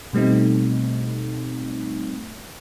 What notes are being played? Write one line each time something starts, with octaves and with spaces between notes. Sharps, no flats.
B2 G3 A3 C4 D#4